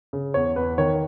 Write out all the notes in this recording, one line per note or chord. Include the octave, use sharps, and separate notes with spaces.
C#3
E2 C#5
E2 B4
D#3 C#5